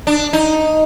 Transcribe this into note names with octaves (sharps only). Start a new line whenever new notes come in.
D4
D#4